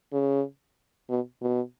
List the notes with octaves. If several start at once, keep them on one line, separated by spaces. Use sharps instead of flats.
C#3
B2
B2